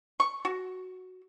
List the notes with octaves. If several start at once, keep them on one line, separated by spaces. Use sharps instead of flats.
C#6
F#4